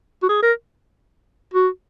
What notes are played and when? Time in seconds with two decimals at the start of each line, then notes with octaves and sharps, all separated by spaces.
0.23 F#4
0.29 G#4
0.43 A#4
1.53 F#4